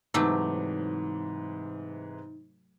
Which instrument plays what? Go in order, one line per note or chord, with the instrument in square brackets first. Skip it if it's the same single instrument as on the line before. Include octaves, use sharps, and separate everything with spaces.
[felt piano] G#2 C3 E3 [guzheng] F#3 A3 G4 [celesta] D#4